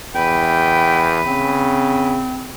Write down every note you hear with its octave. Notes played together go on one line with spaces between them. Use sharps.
E2 B4 G5
C#3 C4